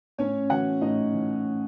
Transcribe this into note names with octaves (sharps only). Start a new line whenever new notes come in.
A2 C#4 C#5
E3 F#4 F#5
A2 D#4 D#5
E3
A2